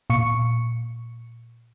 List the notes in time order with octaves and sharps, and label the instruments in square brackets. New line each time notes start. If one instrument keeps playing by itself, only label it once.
[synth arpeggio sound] A#2 C#6 C#7